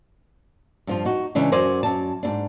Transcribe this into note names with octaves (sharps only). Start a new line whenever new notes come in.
G2 F3 F4
D#4 F#4
C#3 E3 G#3 D4
F#2 A#4 C5 D5 G#5
F#2 A5
G#2 B2 D4